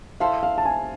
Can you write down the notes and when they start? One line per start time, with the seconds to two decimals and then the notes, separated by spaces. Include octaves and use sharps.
0.20 E4 A4 C5 F5
0.43 F5
0.58 A5
0.65 G#5